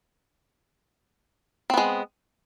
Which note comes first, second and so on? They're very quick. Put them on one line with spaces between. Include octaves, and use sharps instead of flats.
C4 B3 G#3